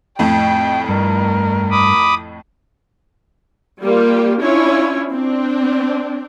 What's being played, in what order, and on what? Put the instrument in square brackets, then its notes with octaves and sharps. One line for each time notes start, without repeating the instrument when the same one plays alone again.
[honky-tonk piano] F2 A2 [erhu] G5
[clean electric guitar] G2 [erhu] A#4
[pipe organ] B5 D6 D#6
[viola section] G3 A#3 F4 G4
C#4 D4 E4 F4 C#5
C4 D4